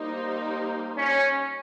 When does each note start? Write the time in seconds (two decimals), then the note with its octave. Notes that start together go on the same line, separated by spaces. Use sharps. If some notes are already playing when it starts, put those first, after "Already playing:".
Already playing: G3 A#3 D#4 G4 C5
0.97 C#4